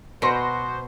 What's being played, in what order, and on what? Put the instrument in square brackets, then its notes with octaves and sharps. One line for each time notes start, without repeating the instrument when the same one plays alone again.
[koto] B2 [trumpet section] B3 F#4 C5 [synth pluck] C6 A#6 C#7